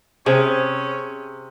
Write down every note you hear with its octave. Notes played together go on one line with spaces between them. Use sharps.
C3 C#4 G#4 C5 E5 G#5